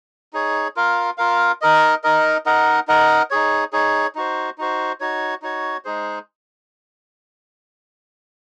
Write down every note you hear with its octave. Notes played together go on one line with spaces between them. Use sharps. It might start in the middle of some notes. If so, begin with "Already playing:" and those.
D#4 G#4 C#5
F4 A#4 F5
F4 A#4 F5
D#4 A#4 D#5
D#4 A#4 D#5
D#4 A#4 D#5 F#5
D#4 A#4 D#5 F#5
D#4 G#4 C#5
D#4 G#4 C#5
D#4 F#4 C5
D#4 F#4 C5
D#4 F#4 C#5
D#4 F#4 C#5
G#3 D#4 G#4 C5